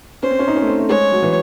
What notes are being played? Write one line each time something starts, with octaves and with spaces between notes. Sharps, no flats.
C#4 C5
C4
C#4
D#4
C#4
A3
C4
A3
G#3 C#5
F#3
E3